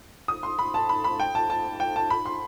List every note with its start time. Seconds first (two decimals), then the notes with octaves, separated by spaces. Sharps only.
0.28 D#6
0.43 C6
0.59 B5
0.74 A5
0.89 B5
1.04 B5
1.20 G5
1.35 A5
1.50 A5
1.80 G5
1.96 A5
2.10 B5
2.26 C6